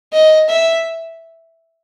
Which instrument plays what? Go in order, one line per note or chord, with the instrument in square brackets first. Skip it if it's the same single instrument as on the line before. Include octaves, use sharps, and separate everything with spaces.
[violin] D#5
E5